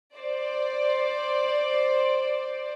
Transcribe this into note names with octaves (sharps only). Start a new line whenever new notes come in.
C5 D5